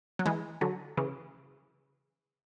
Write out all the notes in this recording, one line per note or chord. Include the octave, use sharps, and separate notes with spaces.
F#3
E3 G#3
D3 F#3
C#3 E3